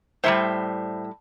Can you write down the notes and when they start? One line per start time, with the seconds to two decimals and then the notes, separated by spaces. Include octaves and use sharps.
0.24 A2 E3 G3 C5 E5